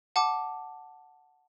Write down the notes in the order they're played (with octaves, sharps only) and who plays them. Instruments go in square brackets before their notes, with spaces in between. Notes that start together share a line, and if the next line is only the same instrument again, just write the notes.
[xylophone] F#5 A5 D6